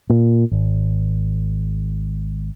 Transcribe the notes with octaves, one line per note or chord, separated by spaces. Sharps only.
A#2
G#1